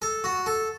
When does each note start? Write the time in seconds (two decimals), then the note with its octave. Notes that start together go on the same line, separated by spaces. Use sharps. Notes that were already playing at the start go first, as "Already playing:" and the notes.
0.02 A4
0.24 F#4
0.46 A4